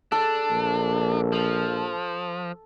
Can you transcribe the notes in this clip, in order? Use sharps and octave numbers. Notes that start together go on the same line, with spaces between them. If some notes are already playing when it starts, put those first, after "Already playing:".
D4 A4
A#1
F3